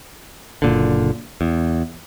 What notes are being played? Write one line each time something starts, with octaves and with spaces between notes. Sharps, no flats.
F#1 A#2 D3
E2